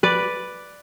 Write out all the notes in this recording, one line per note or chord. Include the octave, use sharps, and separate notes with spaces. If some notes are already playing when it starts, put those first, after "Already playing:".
B4 D5